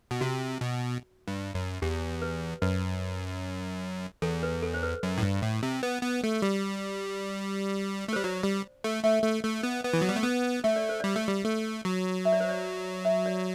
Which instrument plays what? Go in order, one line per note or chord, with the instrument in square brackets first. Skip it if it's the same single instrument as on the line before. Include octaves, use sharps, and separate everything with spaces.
[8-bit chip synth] B2
[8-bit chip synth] C3 [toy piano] F#4
[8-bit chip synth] B2
G2
F#2
[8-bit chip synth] E2 [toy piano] G4
[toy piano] B4
[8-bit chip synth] F#2 [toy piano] B4
[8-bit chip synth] E2 [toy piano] A4
[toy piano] B4
A4
C5
B4
[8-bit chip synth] F#2
A2
G2
A2
C3
B3
B3
A3
G3
A3
[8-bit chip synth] G3 [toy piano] C5
[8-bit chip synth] F#3 [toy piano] D5
[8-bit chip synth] G3
A3
[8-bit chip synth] A3 [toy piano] E5
[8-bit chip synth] A3
A3
B3
B3
E3
F#3
G3
A3
B3
[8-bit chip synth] A3 [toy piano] E5
[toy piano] D5
C5
[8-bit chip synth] G3 [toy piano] D5
[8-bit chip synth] A3
G3
A3
F#3
[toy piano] E5
D5
C5
D5
E5
D5